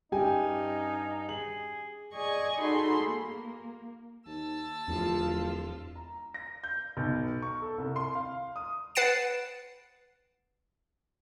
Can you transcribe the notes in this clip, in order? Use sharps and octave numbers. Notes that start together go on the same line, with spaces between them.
G2 C#4 D#4 G4 G5 G#5
G#4 F#7
G#4 D5 D#5 G#5 C#6 G#6
D#4 F#4 G#4 A4 B5 C6
A#3
D#2 A5 E6
D1 E2 F3 F4
A#5
A#6
G6
B1
C#6
A4
C2
C6
F5
D#6
B4 F#5 A6 C7 D7 E7